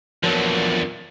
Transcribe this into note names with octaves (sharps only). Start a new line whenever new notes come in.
E2 A#2 D3 F3 F#3 B3